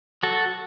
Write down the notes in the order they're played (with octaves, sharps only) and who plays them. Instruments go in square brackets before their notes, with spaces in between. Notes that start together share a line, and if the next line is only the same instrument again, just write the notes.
[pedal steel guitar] F#3 F#4 A4